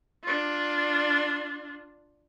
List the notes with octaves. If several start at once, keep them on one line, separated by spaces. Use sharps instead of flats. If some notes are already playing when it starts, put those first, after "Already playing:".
D4 F4